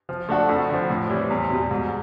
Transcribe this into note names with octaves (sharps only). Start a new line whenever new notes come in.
F3
A3 D4 F#4 A4
F2
D3 F3
A2
E3 G3 C4
E2
B2 G3
G#2